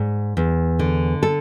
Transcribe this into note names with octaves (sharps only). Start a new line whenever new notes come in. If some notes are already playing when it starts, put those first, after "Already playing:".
Already playing: G#2 D5
E2
D3
A4